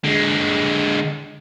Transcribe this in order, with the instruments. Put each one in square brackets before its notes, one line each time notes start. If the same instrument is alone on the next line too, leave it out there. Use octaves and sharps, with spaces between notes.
[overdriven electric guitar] D3 G#3